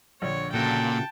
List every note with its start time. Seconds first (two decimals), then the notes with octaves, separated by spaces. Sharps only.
0.22 A#1 D3 C#5
0.54 A#2 C#3 F#4 A4 G5 A5